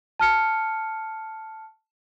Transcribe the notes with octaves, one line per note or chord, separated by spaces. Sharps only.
A5 F6 C#7